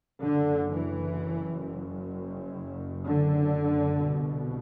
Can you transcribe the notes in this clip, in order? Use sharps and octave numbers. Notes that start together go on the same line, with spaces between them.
F#1 F#2 D3
E3
D3
C2 B2